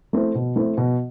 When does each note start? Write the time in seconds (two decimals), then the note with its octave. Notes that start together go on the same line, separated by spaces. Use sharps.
0.13 A3 C4 E4
0.35 B2
0.56 A3 C4 E4
0.77 B2